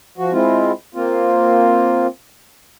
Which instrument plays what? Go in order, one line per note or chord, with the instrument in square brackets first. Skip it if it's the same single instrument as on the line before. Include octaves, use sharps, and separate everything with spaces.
[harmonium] F3 F#4
G#3 C4 E4 F4
A#3 C4 F4